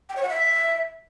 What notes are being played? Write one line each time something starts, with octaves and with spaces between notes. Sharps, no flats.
G5
C#5
F#5
E5